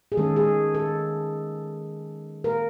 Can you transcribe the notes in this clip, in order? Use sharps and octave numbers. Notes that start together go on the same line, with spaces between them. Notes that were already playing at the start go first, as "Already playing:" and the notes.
G#4
D#3 G#3 C#4 A4
G#4
A4
A#4